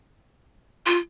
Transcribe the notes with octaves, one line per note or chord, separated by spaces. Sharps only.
F4